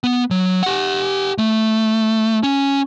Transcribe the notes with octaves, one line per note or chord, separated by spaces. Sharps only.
B3
F#3
G4 F#5
A3
C#4